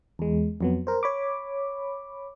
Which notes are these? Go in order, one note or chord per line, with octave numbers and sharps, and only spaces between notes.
E2 G#3
F2 F#3 B3
A#4 C5
C#5 B5 D6